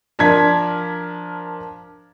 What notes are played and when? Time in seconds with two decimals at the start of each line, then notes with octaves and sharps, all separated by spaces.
0.19 F3 D4 A#4 G#6 B6